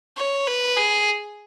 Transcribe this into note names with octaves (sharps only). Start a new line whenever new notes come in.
C#5
B4
G#4